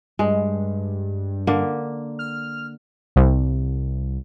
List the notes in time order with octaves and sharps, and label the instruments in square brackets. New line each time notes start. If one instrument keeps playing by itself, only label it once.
[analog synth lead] G2 [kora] G#3
[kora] D3 A#3
[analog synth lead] F6
[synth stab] C2